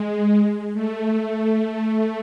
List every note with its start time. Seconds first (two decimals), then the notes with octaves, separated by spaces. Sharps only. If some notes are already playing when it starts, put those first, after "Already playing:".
Already playing: G#3
0.73 A3
1.16 A3